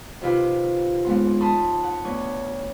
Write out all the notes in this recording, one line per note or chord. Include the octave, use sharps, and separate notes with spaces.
C3 D#3 E4 F4 G4 B4
D#2 G#3 B3 C6
A5 B5 C6 D#6
F#5
D2 B3 C#5